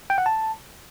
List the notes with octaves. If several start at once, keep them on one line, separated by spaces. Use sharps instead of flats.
G5
F#5
A5